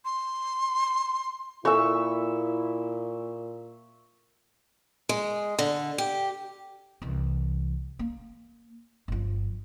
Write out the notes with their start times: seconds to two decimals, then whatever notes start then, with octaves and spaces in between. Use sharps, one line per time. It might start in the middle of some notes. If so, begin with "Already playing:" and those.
0.05 C6
1.65 A#2 E4 A4 E5 G#5 C#6
5.09 G#3
5.59 D3
5.98 G4
7.02 C2 E3
7.99 A#3
9.08 G1 F3